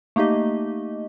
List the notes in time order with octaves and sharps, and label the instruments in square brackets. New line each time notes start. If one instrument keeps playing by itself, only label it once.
[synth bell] A3 A#3 D#4 G4 D#5